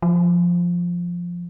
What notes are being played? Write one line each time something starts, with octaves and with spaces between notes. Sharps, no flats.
F3